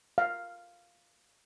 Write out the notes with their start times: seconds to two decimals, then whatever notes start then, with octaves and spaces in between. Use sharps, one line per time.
0.18 F5